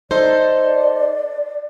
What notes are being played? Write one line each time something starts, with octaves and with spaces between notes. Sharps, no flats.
D#4 A4 C5 D5